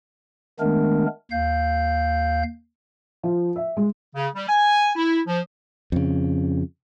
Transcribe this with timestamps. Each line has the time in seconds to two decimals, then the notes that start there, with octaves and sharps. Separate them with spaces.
0.60 D#3 G#3 A3 B3 D4 A#4
1.31 D#2 F5 G6
3.23 F3
3.56 E5
3.77 G#3
4.15 C#3
4.35 G3
4.49 G#5
4.95 E4
5.27 F3
5.92 F2 C#3